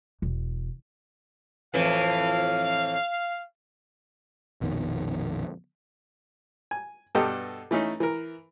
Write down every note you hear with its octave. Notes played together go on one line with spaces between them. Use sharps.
E1
F2 A2 E3 F5
A#1 F2 B2 D#3
G#5
G2 B2 G4 A4 D#5
E3 A3 C#4 D#4
E3 A#4